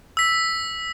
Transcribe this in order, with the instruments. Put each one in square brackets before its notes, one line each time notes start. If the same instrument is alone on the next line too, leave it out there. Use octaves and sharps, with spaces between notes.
[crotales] E6 B6